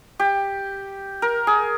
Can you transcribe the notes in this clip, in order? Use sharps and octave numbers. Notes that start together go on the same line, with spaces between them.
G4
A#4
G#4